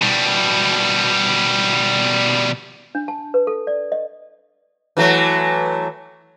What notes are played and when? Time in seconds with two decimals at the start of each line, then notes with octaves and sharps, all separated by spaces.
0.02 B2 G3
2.95 D4
3.08 A5
3.34 B4
3.47 A4
3.67 D5
3.92 D#5
4.97 E3 F#3 A3